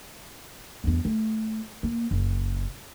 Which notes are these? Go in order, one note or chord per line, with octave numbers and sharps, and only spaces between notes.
E2 G2
A3
A#3
F#1